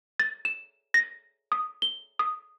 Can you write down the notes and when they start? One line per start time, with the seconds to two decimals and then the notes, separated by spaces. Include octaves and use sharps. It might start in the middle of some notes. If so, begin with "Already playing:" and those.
0.20 A6
0.45 E7
0.94 A#6
1.52 D#6
1.82 G7
2.19 D#6